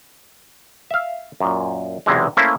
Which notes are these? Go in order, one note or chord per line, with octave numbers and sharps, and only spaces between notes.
E5 F5
F#2 A#2
B1 E2 C3 E3 G#3
A3 A#3 C#4 E4 C5